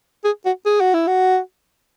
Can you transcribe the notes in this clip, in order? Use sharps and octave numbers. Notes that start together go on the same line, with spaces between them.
G#4
F#4
G#4
F#4
E4
F#4